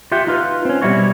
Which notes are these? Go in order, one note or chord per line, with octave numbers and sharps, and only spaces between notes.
F4 G4 E5 F#5 G5
D#4 F4 B4
C4 C#4
B2 G3 E4 F#4 C#5